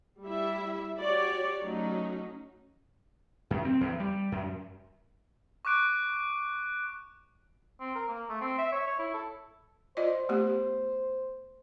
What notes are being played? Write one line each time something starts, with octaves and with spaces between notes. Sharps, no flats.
G3 E4 E5
F#4 G4 C#5 D5
F#3 A3 C#4 D#4
F#2
C4
E2
G3
F#2
C#6 D6 F#6 D7
C4
A#4
A#3
A3
C4
E5
C#5
C#5
E4
A4
F4 C5 D5 D#5
A3 B3 G4